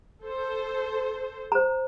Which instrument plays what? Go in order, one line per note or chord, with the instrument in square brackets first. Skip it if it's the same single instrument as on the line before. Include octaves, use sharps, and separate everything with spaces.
[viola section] A4 C5
[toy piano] C5 A#5